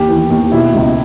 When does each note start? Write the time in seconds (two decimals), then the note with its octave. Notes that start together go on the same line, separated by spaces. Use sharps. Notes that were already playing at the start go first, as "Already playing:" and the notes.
Already playing: D#2 G4
0.09 E3
0.30 D#2
0.52 B2 E4
0.74 C#2